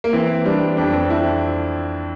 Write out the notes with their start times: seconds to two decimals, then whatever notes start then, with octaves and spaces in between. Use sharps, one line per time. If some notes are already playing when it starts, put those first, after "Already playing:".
0.04 A#3
0.13 E3 C4
0.45 G3 D4
0.77 F2 D4
0.94 C4
1.10 F2 E4